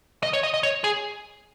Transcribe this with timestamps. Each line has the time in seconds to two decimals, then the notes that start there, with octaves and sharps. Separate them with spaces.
0.23 D#5
0.33 C#5
0.43 D#5
0.54 D#5
0.63 C#5
0.84 G#4